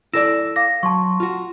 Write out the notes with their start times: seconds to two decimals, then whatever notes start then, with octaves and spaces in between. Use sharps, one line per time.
0.13 E4 A4 D5 E6 A#6 E7
0.56 F5 D6 A#6
0.83 F#3 A5 C6 C#6
1.20 F4 F#4